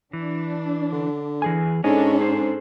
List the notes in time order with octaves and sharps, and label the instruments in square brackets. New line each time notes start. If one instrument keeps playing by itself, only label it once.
[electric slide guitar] E3 [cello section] D4
[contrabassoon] D3
[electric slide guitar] E3 G#4 G#5
[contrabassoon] G#2 [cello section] C#4 D4 A4 [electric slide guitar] C#5 D#5 G#5
[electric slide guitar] G#4 C5